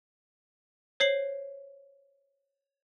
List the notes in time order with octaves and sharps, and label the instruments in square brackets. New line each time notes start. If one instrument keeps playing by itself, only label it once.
[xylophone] C5 C#5 C7 F#7